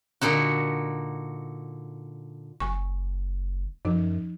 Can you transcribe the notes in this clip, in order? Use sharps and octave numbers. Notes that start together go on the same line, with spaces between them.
A#2 D3 D#4 F#4
F#1 G#5 C#6
F#2 F3 D#4